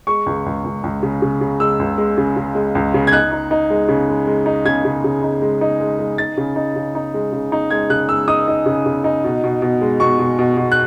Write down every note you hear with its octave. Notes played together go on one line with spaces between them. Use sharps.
G#3 C#6
C#2
C#2
C#2
C#2
C#3
C#3
C#3
G#3 E6
C#2
G#3
C#3
C#3
G#3
C#2
C#3
G#6
D#4 F#6
D#4
D#4
G#3
C#3
G#3
G#3
D#4
C#3 G#6
C#3
C#3
D#4
G#3
D#4
G#3
G#3
D#4 A6
C#3
D#4
C#3
D#4
G#3
C#3
D#4
G#3 G#6
C#3 F#6
G#3 E6
D#4 D#6
D#4
C#3
C#3
D#4
B2
B2
B2
G#3
B2 C#6
B2
B2
B2
F#6